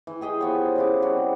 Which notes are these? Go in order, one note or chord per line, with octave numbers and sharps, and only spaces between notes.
E3
G4 G#4 D#5 G5
F3 B3 C#5
C#3 E4 D6
C3 G3 F#4